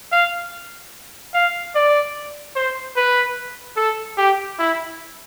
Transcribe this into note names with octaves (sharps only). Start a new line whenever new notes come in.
F5
F5
D5
C5
B4
A4
G4
E4